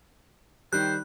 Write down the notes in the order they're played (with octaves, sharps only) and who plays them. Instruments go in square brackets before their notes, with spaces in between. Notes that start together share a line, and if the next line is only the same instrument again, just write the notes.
[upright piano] D#3 G3 [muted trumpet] C5 [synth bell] F#6